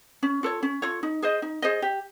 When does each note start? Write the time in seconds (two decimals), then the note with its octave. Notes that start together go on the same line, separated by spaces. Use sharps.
0.23 C#4
0.43 F4 A4 C#5
0.63 C#4
0.82 F4 A4 C#5
1.03 D#4
1.22 G#4 C5 D#5
1.42 D#4
1.62 G#4 C5 D#5
1.82 G4